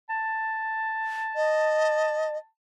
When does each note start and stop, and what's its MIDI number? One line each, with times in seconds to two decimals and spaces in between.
0.09 2.46 81
1.36 2.37 75